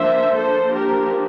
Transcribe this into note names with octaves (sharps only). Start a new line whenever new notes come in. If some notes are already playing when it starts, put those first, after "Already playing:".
Already playing: F3 A#3 D4 C5 E5
F3 A#3 D4 A4 C5
G4 A#4